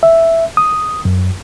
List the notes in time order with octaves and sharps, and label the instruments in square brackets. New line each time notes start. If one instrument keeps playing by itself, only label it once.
[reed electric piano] E5
D#6
F#2